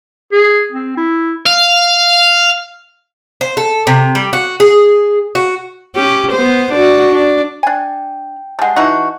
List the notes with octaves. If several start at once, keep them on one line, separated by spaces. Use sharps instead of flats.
G#4
C4
E4
F5
C5
A4
C3
G3
F#4
G#4
F#4
C#4 G4
B3 C5
D4 F#4
D4
D4 G5 G#5
G3 G#3 F#5 A5
E3 D#4 F#4